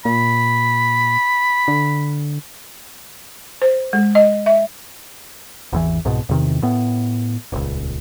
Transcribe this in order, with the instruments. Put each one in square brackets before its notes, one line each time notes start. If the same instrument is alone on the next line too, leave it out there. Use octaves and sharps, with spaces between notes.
[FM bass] A#2 [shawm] B5
[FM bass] D3
[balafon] C5
G#3
D#5
E5
[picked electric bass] G#1 E2 E3
C2 G#2 B2
E2 C3 D#3
A2 B3
D#1 C#2